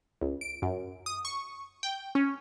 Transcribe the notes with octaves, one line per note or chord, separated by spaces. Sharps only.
C#2
D7
F#2
D#6
C#6
G5
C#4